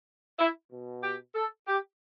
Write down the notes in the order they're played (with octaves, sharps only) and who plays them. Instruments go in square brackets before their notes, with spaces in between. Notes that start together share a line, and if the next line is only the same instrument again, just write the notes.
[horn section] E4
B2
G4
A4
G4